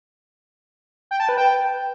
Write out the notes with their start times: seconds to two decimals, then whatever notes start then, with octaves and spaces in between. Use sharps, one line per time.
1.11 G5
1.20 A5
1.29 B4
1.38 G5